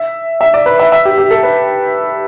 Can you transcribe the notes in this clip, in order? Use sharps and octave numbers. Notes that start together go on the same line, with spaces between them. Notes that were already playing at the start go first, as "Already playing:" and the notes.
Already playing: E5
E5
D5
B4
E5
E5
G4
G4
A4
B4